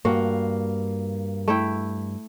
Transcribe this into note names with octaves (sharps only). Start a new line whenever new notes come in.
G2 A#3 F#4
A3 E4 G5